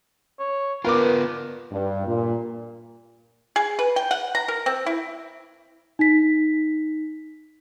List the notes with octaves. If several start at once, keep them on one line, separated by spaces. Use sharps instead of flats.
C#5
B3 F4 A#4 B4 D6
G2
A#2
G#4
B4
G5
F#5
A#5
A#4
C4
E4
D#4 B6